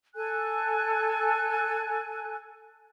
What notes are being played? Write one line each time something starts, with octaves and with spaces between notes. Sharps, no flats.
A4 G#5 F#6